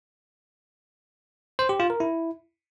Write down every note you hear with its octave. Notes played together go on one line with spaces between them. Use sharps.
C5
G4
F4
A#4
E4